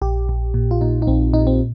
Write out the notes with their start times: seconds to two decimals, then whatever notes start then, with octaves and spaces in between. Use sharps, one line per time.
0.01 A#1 G4
0.29 A#1
0.54 A#2
0.71 F4
0.81 A#2 D#4
1.02 D#4
1.07 A#1 C4
1.34 A#2 D#4
1.47 C4